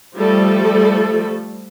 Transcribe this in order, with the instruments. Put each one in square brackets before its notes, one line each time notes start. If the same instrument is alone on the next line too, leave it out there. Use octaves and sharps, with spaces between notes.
[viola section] F3 G3 A3 A4